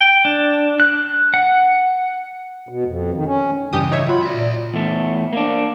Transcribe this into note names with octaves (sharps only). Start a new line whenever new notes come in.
G5
D4
F#6
F#5
B2
F2
D#3
C#4
G2 C#3 E3 G4 D#6
D#4 C#5 E5
F#3 F4 B5
D5 E5
A#2
E2 A3
A#3 D4